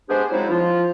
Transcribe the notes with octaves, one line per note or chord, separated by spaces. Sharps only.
G#3 B3 D4 G4 G#4 C5
F3 F#3 G#3 C4 D#4 E4
F3 F4